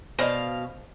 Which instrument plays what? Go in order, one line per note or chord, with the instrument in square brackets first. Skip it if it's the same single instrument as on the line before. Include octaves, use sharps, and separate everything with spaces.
[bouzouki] B2 F5 [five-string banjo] C5 D5 D#5